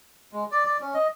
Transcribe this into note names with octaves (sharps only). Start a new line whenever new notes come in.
G#3
D5
D5
C#4
D#5